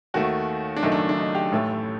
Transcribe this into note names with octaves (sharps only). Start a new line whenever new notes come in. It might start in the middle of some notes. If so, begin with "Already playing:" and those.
D#2 D#3 A3 F#4
D4
F#1 F#2 D#3 A3 D#4
D4
D4
D#4
G4
A1 A2 A3